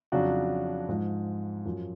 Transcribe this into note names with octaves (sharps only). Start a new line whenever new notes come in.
F2 C#3 F#3 D4 F#4
G#2 F3
F#2 F3